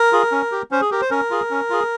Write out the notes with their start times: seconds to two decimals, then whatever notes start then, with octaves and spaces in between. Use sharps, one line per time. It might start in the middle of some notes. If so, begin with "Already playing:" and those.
Already playing: A#4
0.12 F4 G#4
0.32 C#4
0.52 G4
0.71 C#4 C5
0.81 G#4
0.91 G4 A#4
1.01 C5
1.11 C#4 A#4
1.30 F4 G#4
1.51 C#4
1.70 F4 G#4